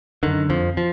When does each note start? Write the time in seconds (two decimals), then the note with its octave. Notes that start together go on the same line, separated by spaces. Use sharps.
0.23 F#2 D3 D#3
0.49 F2 F3
0.77 F3